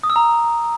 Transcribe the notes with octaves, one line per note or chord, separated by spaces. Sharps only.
D#6
E6
A#5